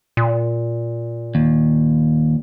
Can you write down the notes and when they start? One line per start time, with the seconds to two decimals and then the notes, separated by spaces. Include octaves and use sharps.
0.17 A#2
1.35 D#2